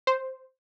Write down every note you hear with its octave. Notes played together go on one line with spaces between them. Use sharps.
C5